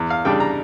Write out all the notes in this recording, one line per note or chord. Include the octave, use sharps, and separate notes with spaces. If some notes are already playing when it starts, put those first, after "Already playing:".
Already playing: E2
F5
C#3 G3 D4 G5
A#5